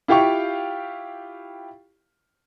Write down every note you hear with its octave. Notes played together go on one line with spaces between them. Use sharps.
E4 F4 G4 F5 G5 C#6